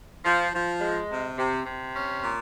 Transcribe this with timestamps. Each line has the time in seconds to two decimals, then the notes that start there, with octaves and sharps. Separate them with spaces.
0.24 F3
0.53 F3
0.81 G#3
1.09 C3
1.38 C3
1.66 C3
1.94 C#4
2.23 A#2